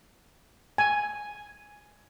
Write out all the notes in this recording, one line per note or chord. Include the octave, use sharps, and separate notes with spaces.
G#5